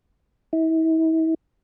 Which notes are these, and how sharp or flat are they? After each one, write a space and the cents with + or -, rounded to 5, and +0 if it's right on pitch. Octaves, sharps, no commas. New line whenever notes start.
E4 -40